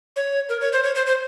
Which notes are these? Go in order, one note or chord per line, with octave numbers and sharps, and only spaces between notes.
C#5
A#4
C#5
C5
C#5
C5
C5